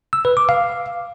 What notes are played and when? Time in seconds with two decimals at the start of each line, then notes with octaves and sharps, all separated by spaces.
0.13 E6
0.25 B4
0.37 D6
0.49 F5